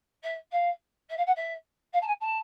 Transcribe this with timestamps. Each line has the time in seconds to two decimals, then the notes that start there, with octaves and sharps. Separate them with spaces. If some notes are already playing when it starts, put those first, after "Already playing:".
0.23 E5
0.51 F5
1.09 E5
1.17 F5
1.26 F#5
1.35 E5
1.93 F5
2.01 A5
2.06 G#5
2.20 A5